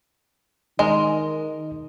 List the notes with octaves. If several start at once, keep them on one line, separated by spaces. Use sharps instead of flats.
D#3 G#3 A#4 D#5